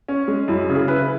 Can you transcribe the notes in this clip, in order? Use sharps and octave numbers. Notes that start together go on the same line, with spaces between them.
C#4
G#3
F#2 E4
C#3
G#4
E4 B4